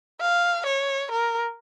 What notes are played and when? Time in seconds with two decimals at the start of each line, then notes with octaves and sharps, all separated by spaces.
0.21 F5
0.66 C#5
1.11 A#4